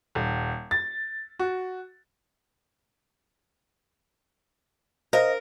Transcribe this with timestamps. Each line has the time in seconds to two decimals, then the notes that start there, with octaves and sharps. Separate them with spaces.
0.15 D#1
0.71 A6
1.39 F#4
5.13 A#4 C5 D#5 F5